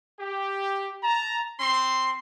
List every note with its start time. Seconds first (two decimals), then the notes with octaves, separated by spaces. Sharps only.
0.20 G4
1.04 A5 A#5
1.60 C4 C6